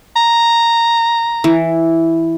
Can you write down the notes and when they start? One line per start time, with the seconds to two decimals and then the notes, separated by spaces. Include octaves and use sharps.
0.16 A#5
1.44 E3